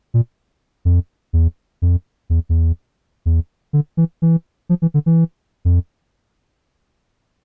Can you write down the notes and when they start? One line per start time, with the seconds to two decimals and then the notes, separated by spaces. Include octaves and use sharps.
0.14 A#2
0.85 F2
1.33 E2
1.82 F2
2.30 E2
2.49 E2
3.26 E2
3.73 D3
3.97 E3
4.22 E3
4.69 F3
4.82 E3
4.94 D3
5.06 E3
5.65 F2